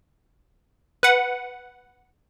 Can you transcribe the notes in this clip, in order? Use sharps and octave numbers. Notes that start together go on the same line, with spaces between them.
B4 F#5